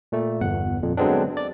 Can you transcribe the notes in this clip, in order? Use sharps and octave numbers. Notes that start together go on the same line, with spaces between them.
A#2 A3
G1 E2 F#5
F2 A#2
D3 F#3 G#3 B3 C4 D4
D5